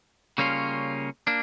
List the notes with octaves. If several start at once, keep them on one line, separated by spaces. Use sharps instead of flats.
C#3 G3 A#3 C#4 F4
A#3 D4